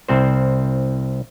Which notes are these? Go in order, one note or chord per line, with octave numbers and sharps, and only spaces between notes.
C2 C4 C5